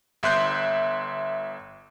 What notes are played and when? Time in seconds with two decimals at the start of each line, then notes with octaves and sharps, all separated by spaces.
0.23 G1 E5 C6 F#6 G6